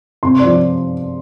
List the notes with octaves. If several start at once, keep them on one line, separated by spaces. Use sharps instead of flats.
C3 C6
D5
F3